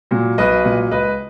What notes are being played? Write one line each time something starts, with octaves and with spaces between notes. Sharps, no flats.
A#2 F#3
B1 B4 D#5
A#2 F#3
C#2 B4 D#5